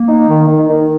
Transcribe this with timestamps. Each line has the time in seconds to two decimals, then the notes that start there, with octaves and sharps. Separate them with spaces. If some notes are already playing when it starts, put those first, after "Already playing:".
Already playing: A#3
0.08 D#4
0.28 D#3
0.48 D#3
0.69 D#3